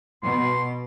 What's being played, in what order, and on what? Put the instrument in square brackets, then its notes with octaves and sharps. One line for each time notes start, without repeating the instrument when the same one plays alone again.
[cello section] B2 [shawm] C6